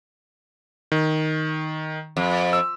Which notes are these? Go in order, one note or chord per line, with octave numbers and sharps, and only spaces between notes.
D#3
F2
E6